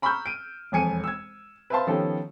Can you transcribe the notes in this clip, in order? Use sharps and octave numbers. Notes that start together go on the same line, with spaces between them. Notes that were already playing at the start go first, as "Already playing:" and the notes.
A#5 B5 C#6 E6 F6 G6
D7 D#7
E1 F2 G#5 C#7 D#7
E6 G#6
B4 C5 E5 F5 A5 C6
D#3 F3 B3 C#4 G4 A4